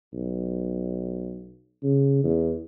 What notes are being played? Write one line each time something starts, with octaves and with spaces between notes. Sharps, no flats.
B1
C#3
E2